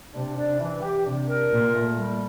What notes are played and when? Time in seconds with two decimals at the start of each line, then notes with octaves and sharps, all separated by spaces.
0.14 C3 D4
0.37 D4
0.60 E3
0.82 G4
1.05 C3 D4
1.27 A#4
1.50 A#2 F4
1.73 A3
1.96 G3